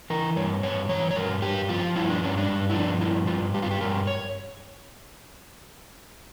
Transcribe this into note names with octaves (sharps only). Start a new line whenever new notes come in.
E3 A#4
G2 C#5
G2 C#5
E3 C#5
C#5
G2 A#4
G2 G4
F3 F4
G2 E4
D4
G2 C#4
D4
G2
E4
F3 D4
G2 E4
G2 F4
G2 G4
F4
G4
G2 A#4
C#5